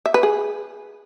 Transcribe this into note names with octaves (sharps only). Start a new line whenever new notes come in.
E5
B4
G#4